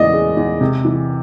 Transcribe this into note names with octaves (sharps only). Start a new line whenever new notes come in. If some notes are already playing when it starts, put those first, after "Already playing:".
Already playing: E2 C#3 E3 D5 D#5
G#3
E2
C3
E3